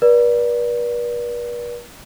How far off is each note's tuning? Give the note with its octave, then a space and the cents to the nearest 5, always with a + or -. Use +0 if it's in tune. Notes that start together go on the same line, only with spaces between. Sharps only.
B4 -45 D5 +0